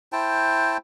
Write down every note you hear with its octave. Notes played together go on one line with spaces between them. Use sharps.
E4 C5 G5 A5